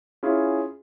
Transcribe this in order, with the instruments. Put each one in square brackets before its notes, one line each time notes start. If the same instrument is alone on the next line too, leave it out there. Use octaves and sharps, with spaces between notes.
[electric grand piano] C#4 E4 F4 G#4